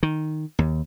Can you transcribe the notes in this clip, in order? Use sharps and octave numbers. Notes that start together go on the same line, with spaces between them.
D#3
D#2